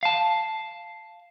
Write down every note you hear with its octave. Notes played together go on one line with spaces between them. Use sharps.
F5 A5